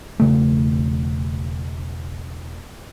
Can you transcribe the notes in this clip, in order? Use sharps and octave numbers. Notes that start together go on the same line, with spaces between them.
E1 C#3 A3